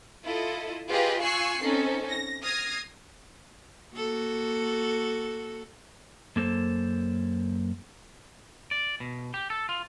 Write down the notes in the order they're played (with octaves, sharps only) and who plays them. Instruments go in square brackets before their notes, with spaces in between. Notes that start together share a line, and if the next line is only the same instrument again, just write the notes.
[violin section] E4 F4 A4 D#5
F4 G4 G#4 B4 D#5 F5
F4 G#5 C#6 E6 F#6 C7
C4 C#4 D#4 A4
A#6
D#6 F6 G#6 A#6 C7
[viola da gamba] A#3 F#4 A4
[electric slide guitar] F#2 A#3 A4 C5
[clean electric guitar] D5
B2
G4
A4
F4